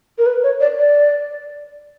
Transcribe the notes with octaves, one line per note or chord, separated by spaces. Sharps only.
A#4
B4
C#5
D5
D5